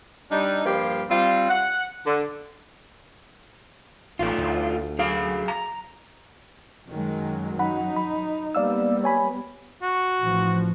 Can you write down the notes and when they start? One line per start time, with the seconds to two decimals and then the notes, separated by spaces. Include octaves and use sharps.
0.31 G3 D4 D#4
0.65 G2 F3 G3 A#3 F4 G4
1.09 G3 C4 F4
1.49 F#5
2.06 D3
4.19 A1 A3 F4
4.38 D2
4.98 F#2 G#4 F5
5.48 A#5
6.89 F#2 D#3 F#3 G#3
7.59 D#4 F#5 B5
7.96 B5
8.55 G3 A#3 B3 D5 F5 E6
9.04 C#5 G#5 B5
9.83 F#4
10.21 A1 F3